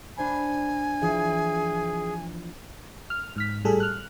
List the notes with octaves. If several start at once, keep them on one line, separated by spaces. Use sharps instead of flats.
D4 C5 G#5 B5
E3 F3 G#4
F6
G#2 F6 B6
A2 G3 G#4 A4
F6 F#6